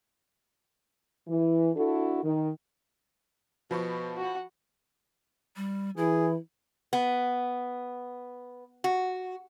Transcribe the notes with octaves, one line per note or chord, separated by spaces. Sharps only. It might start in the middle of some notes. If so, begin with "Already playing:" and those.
E3
D4 E4 F#4 A4
D#3
B2 F3 B5 C#6
F#4 F#5
G3
E3 E4 G#4
B3
F#4